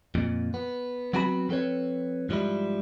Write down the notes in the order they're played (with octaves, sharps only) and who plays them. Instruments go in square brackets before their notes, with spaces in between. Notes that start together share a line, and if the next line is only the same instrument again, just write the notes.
[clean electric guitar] F2 A#2
B3
F#3 B3 C4 F#4 G#5 B5
F3 C4 A4 B4 C#5
G#2 F3 G3 E4